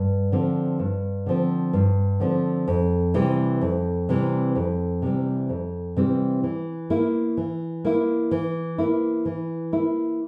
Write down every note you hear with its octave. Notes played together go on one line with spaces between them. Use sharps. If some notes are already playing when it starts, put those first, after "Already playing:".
Already playing: G2
D3 F3 C4
G2
D3 F3 C4
G2
D3 F3 C4
F2
C3 E3 G3 C4
F2
C3 E3 G3 C4
F2
C3 E3 G3 C4
F2
C3 E3 G3 C4
E3
A#3 E4
E3
A#3 E4
E3
A#3 E4
E3
A#3 E4